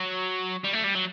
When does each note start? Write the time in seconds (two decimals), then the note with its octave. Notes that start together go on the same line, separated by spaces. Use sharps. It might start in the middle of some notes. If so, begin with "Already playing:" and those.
Already playing: F#3
0.64 G3
0.73 A3
0.84 G3
0.95 F#3